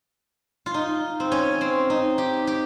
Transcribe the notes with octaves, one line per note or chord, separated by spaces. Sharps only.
F4
D#4
C4
C#4
C4
D#4
G4
G4